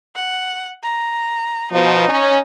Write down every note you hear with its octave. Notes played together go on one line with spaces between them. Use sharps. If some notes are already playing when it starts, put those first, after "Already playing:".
F#5
A#5
B2 F3 D#4
C#4